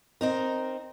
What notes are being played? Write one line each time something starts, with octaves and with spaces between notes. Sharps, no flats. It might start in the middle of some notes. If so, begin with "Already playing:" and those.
C4 D#4 A#4